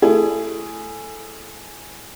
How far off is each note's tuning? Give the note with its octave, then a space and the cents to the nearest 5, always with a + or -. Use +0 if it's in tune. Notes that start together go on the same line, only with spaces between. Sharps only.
A3 +0 E4 +25 G#4 +0